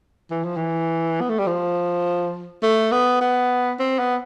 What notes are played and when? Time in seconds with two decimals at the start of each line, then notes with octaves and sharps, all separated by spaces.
0.31 E3
0.45 F3
0.56 E3
1.21 B3
1.29 A3
1.39 G3
1.47 F3
2.63 A3
2.92 B3
3.21 B3
3.79 C4
3.99 B3